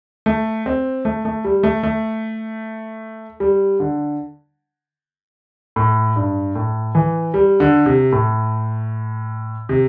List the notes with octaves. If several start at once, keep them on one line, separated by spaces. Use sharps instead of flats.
A3
C4
A3
A3
G3
A3
A3
G3
D3
A2
G2
A2
E3
G3
D3
C3
A2
C3